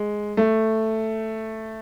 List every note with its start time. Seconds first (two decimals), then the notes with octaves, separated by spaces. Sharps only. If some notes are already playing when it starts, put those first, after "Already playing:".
Already playing: G#3
0.37 A3